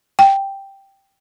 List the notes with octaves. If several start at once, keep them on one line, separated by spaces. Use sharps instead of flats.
G5